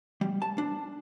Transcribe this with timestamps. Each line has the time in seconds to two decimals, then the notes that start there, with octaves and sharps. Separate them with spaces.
0.21 G3
0.42 A5
0.58 D4